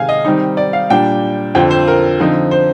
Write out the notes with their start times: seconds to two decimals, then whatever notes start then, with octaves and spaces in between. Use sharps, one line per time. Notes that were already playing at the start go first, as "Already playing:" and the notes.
Already playing: C3 D#3 G#3 F5 G#5
0.09 D#5
0.25 D#3 G3 C4 D#4
0.57 D5
0.73 F5
0.90 A#2 G3 D4 G5
1.55 F2 D3 F3 G5
1.71 C5
1.88 A#4
2.20 D3 F3 C4 D#4
2.51 C5